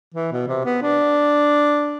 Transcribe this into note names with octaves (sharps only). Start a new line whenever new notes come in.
E3
B2
C3
B3
D4